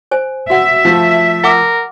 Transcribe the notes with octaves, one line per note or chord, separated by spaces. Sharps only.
C5 G#5
F#4 E5 F#5
F3 A3
A#4 F#5 D6